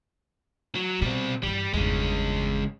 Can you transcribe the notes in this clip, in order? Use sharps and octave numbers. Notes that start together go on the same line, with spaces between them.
F#3
B2 G3 C4
G2 E3 G3
G1 E2 C#3 G#3